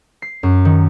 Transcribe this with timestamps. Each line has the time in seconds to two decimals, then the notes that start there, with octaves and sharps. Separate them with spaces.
0.22 C7
0.43 F#2
0.65 D#3